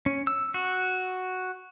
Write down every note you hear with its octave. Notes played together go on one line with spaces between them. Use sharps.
C#4
E6
F#4